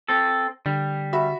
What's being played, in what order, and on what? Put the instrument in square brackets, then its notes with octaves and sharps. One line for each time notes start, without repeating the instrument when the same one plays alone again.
[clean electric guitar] C4 A4
[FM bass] D3 [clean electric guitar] G3
[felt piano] F#4 E5 B5